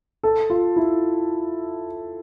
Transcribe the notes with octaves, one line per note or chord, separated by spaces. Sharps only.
A4
F4
E4